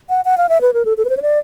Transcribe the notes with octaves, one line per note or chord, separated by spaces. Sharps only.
F#5
F#5
F5
E5
B4
A#4
A4
A4
B4
C5
C#5
D5